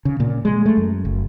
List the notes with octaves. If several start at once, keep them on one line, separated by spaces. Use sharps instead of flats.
C#3
A#2
G#3
A3
F#2
F#1